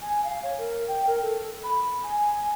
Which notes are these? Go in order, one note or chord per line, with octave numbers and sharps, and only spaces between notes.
G#5
F5
C#5
A#4
G5
A#4
A4
B5
G#5